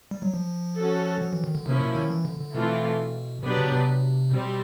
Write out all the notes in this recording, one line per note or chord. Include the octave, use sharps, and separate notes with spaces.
G3
F#3
F3
C#4 F#4 A4
F3
E3
D#3
D3
C3 F3 A#3 C#4 E4
B2
D#3
E3
D3
D3
B2 E3 A3 C4 F4 A4
B2 F#3 B3 D4 G4 B4
C#3
C3
B2 G3 C4